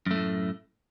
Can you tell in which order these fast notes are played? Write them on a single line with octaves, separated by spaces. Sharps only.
F#2 A3 A2